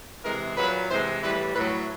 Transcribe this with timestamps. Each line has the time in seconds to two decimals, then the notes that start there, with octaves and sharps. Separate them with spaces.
0.24 C3 E3 G#3 A#4
0.57 A#2 F#3 B4
0.89 C3 E3 G#3 C5
1.22 A2 E3 G3 B4
1.55 A2 F#3 B4